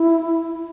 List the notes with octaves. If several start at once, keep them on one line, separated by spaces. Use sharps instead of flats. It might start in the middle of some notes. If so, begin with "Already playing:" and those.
Already playing: E4